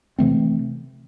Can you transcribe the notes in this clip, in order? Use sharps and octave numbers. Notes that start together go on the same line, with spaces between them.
C3 E3 A3 C4